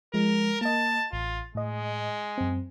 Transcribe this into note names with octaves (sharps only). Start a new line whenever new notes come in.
F3 G#3 A#4
A#3 D#5 A5
A1 F4
A2 G#3 D#5
F#2 C4